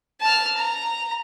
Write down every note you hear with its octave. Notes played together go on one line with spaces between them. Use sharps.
A5 F6
A#5